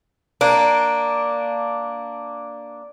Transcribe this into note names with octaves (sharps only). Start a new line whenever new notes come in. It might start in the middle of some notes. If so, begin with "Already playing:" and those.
A#3 D4